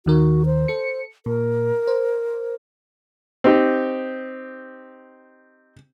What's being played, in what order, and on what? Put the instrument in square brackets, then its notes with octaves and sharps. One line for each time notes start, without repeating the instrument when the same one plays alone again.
[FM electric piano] D#2 D#3 A#4 [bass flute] F#4
[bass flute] C5
[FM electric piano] A4 C#7
[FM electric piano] A#2 [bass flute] A#4
[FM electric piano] C5
[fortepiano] C4 D#4 G4